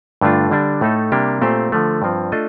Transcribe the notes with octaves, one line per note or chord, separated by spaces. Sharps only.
G2 D3 A3 D4 F4
D3 G3 D4
A2 A3 D#4 A4
C3 G3 A#3 D4 G4
A#2 A3 C4 G4 C5
D3 F3 A3
G2 F3 C4
A3 D4 F4 A4 D#5